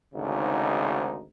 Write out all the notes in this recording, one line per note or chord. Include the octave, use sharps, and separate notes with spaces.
G#1 D2 G#2 C#3 D#4